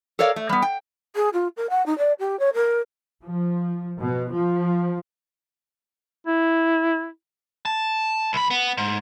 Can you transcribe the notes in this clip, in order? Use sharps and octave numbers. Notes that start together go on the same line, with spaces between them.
A4 A#4 C#5 D5 F5
A3
G3 B3
G5
G#4
F4
A#4
F#5
D#4
D5
G4
C#5
A#4
F3
B2
F3
E4
A5
C2 B5
B3
G#2